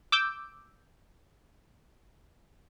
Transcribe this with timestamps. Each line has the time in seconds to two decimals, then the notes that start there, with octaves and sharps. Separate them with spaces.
0.12 D6 E6 G6